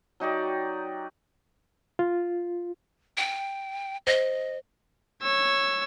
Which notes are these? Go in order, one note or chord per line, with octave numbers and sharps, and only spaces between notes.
F#3 D#4 G4 D5
F4
G5
C5 D#5
C#5 E6